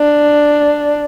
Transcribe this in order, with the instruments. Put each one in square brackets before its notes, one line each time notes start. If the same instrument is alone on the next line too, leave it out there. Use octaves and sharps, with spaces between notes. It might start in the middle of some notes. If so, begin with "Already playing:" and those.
Already playing: [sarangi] D4